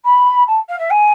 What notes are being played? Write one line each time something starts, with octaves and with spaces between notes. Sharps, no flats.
B5
A5
F5
E5
G#5